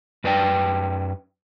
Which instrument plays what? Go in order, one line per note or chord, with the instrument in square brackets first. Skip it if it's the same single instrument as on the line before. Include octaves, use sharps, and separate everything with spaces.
[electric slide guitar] F#2 B4 D5 G5